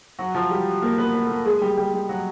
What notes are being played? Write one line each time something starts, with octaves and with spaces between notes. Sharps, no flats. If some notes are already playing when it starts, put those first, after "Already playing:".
F#3 F#4
F3 F4
G3 G4
A#3 A#4
B3 B4
B3 B4
A4
A#3 A#4
G#3 G#4
G3 G4
G3 G4
G3 G4
F#3 F#4